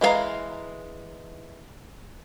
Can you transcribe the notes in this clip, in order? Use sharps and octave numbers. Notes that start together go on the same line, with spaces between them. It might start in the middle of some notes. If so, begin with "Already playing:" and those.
E3 G#3 C4 F5 A#5